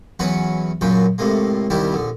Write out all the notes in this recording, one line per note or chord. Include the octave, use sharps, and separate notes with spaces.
E2 F#3 C#4 F#4 B4 F#5
F#2 A#2 C#3 F#3 G5
A2 C3 G#3 A#3
C2 D#3 G3 E4 G4
A#1 D3